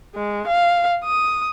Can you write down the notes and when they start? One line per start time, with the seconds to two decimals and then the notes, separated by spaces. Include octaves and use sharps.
0.15 G#3
0.47 F5
1.05 D#6